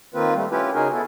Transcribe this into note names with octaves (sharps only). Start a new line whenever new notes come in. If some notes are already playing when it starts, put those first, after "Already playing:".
D#3 A#3 C4 F4 B4
G3 A3
C#4 E4 F4 G4 B4
C#3 C#4 D#4 F#4 G#4 A#4
B3 E4 A4